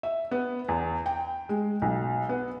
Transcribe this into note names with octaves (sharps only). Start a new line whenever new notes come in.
E5
B3
E2
G5
G#3
B1
B3